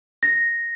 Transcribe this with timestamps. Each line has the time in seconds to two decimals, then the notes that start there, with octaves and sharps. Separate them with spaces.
0.23 A#6